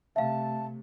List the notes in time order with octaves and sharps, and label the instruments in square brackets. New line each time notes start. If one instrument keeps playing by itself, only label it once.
[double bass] C3 A3 [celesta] E5 F5 [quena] A5